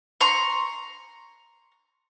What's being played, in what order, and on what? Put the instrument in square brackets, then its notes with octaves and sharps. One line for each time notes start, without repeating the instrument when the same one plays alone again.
[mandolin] A#5 C6 C#6